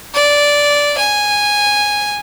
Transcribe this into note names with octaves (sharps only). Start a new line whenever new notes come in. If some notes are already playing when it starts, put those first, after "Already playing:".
D5
G#5